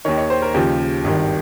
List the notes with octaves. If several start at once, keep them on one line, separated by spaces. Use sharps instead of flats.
D#2 D#3 C#5
C#5
C5
A#4
D#2 C#3 F3 G4
G#1 G2 D#3